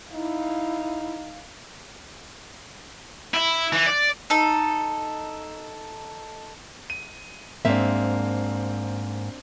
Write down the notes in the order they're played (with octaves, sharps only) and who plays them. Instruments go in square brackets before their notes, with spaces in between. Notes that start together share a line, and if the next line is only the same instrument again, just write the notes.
[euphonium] D#4 [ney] E4 [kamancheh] F5
[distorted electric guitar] E4
E3
D5
[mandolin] D#4 A4
[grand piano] D#7
[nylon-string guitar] G#2 A#3 E5 [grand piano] C4 D4